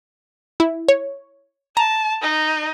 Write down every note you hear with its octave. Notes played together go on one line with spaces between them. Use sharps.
E4
C#5
A5 A#5 A#6
D#4